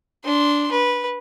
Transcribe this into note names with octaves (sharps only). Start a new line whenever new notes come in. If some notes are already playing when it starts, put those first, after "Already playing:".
D4 C6
B4